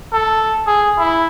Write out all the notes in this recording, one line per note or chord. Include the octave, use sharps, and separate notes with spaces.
A4
G#4
E4